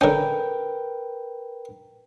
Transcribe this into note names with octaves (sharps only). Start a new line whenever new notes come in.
D3 C#4 A#4 B4 G5